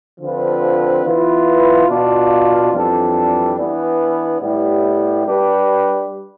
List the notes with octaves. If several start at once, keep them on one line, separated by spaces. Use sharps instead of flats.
D3 F3 C4 F4 B4
E3 B3 F4 B4
B2 B3 D4 F4
F2 E3 G3 D4 A4
E3 B3 D4
A2 G3 B3 E4 G4
G3 D4 G4 B4